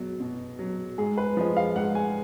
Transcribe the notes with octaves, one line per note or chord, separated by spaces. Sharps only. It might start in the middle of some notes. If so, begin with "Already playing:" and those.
Already playing: B2 F#3
B2
F#3
G#2 G#4
B4
F3 G#3
F5
G#2 F#5
G#5